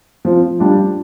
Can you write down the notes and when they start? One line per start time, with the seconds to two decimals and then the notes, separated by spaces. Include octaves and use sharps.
0.25 F3 C4 F4
0.59 G3 D4 F4